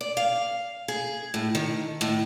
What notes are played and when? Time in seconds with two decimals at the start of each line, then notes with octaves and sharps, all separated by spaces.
0.01 D5
0.17 F5
0.88 G#4
1.34 A2
1.55 D#3
2.01 A2